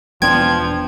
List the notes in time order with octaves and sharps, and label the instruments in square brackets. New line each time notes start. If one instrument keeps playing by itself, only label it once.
[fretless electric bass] E1 B3 D4 [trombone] F3 [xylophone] G5 [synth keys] G#6